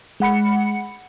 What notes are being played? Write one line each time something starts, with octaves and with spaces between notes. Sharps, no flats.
G#3 F#5 B5 C#7